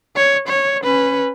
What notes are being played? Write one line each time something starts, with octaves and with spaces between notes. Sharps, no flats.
C#5
C#5
C#4 B4